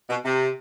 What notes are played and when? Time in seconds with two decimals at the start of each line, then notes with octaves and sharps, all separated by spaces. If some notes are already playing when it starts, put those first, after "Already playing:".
0.09 B2
0.25 C3